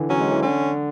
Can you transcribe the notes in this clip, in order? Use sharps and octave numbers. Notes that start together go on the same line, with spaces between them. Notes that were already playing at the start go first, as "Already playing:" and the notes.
Already playing: D3 E3
F#3 C#4
G#3
E3
D3 C#4